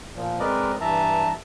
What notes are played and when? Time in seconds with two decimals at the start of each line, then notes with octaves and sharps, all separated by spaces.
0.16 A#2 F3
0.40 G#3 C4 A#4 B4 D5 D#5
0.81 G2 E3 E5 A5 A#5